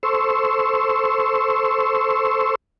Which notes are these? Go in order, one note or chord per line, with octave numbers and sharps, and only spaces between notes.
A4 C5 C6 C#6 E6